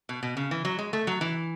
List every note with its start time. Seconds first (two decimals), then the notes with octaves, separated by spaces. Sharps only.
0.09 B2
0.23 B2
0.37 C#3
0.51 E3
0.65 F#3
0.79 G#3
0.93 A3
1.07 F#3
1.21 E3